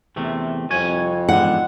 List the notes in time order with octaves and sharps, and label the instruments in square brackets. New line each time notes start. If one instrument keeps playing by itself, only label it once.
[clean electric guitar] E2 C3 A3
[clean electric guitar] C2 C#5 G#5 [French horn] F2
[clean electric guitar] E2 G#2 D3 [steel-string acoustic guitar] F#5